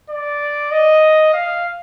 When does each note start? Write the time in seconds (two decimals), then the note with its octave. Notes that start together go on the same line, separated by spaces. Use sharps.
0.10 D5
0.72 D#5
1.33 F5